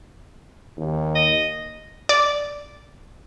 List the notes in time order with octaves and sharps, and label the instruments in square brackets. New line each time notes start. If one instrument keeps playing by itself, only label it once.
[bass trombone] D#2
[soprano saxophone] D#5
[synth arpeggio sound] D5